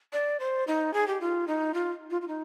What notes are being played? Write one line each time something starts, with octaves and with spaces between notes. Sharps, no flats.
D5
C5
D#4
G#4
G4
F4
D#4
F4
F4
F4
D#4